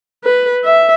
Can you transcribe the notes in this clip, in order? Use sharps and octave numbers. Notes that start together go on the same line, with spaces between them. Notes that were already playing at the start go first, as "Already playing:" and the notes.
B4
E5